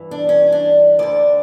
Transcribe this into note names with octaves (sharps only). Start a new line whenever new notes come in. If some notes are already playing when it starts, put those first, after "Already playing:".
Already playing: G2 E3
D4
C#4
D4
D2 D3 D5